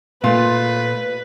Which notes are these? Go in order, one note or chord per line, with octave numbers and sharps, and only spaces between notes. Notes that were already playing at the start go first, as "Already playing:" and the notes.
A#2 A3 A#3 F4 B4